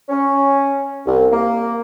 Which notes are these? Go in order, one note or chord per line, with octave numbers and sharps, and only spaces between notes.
C#4
C2
A#3